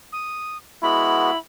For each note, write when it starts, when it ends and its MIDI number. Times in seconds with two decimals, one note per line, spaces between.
0.12 0.57 87
0.83 1.31 56
0.83 1.31 59
0.83 1.38 64
0.83 1.31 66
0.83 1.39 83